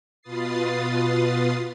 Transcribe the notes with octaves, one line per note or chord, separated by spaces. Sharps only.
B2 F4 B4 D#6 A6 C7